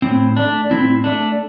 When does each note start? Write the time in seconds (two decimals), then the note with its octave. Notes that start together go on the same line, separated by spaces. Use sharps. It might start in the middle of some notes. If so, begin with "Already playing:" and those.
0.02 A2 C4
0.37 A3 D4
0.70 A2 C4 E4
1.04 A3 D4